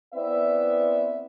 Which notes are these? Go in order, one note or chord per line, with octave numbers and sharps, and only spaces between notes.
B3 C4 E4 B4 D5 E5